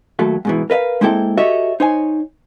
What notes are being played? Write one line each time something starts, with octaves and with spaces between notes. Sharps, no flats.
D#2 F#3 A3
G#2 B2 E3
A#4 B4 D#5 F5
G#3 A#3 C4 E4 A4 G5
F#4 G4 A4 C#5 D#5 E5
D#4 C5 C#5 G#5